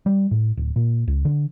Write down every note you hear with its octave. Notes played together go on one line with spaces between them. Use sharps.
G3
A2
D1
A#2
C#2
D3